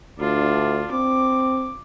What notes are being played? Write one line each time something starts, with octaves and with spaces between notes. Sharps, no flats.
D2 D4 F4
C4 D6